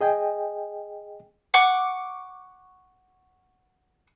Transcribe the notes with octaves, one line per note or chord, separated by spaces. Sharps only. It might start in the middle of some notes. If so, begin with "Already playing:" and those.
G#4 D#5 G5 G#5
F#5 C#6 D6